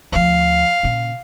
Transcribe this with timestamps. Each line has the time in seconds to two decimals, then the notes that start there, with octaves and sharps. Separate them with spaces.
0.12 D2 F3 F5
0.83 A#2 C#3